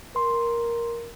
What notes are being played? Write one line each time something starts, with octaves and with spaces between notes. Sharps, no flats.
A#4 C6